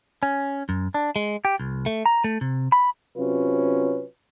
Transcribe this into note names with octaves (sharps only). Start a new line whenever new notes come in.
C#4
F#2
D4
G#3
G4
C2
A3
A#5
A3
C3
B5
C3 F#3 C#4 F4 B4